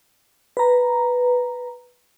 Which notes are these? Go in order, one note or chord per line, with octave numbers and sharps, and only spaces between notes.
B4 A#5